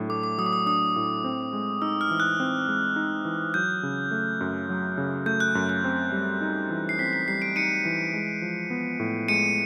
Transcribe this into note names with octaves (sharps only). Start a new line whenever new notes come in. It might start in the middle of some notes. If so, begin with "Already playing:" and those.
Already playing: A2 F#3 D4
A3 D6
D6
F#3 D#6
D6
D#6
D4 D#6
A2
C4
G#3
D#4 E6
F6
E3
F#6
C4
G#3
D#4
E3
F#3 G6
C#3
A3
F#2
F#3
C#3
A3 G6
F#6
F#2
F#6
C4
G3
D#4
E3
C7
C4 B6
B6
G3 C7
C7 D7
D#4 C#7 D#7
E3
G#3
F3
B3
A2
G#3 C#7 D#7